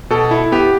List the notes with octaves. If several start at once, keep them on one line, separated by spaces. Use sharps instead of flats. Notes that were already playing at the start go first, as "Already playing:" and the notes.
B2 A4
E4
B3 G4